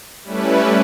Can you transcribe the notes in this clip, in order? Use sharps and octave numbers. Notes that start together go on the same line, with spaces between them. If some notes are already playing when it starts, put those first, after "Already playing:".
G3 A3 C#4 E4 B4